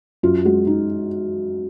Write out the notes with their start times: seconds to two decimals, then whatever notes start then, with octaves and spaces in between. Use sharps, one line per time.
0.23 F#2 F4
0.45 G#3 F#4
0.67 D#4